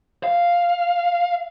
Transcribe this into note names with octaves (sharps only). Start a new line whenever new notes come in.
F5